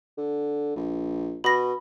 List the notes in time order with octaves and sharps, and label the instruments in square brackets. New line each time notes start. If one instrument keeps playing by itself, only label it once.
[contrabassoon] D3
A#1
[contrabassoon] B2 [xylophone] B5 A#6